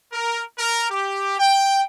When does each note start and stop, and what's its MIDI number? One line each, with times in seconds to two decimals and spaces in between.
0.13 0.42 70
0.59 0.88 70
0.90 1.39 67
1.39 1.82 79